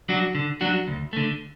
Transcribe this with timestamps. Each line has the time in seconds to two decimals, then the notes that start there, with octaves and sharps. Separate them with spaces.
0.09 F#3 D4 F#4
0.35 D3
0.61 F#3 D4 F#4
0.87 D2
1.13 D3 A3